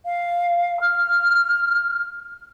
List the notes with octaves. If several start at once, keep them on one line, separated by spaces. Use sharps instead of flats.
F5
F6